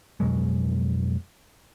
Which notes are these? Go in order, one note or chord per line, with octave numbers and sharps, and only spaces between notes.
F2 B2 F#3 G#3